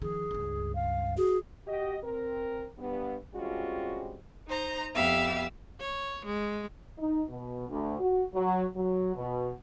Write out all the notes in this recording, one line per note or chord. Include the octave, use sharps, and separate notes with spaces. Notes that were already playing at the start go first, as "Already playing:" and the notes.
D#3 F3 G#4
C#2 G2
F5
F#4 G#4
F#4 G4 D#5
C4 A#4
G2 B3
G3 G#3 C4 C#4 F4 F#4
D#4 C5 A#5
F2 B3 G4 E5 F5 E6
C#5
G#3
D#4
B2
D2
F#4
F#3
F#3
B2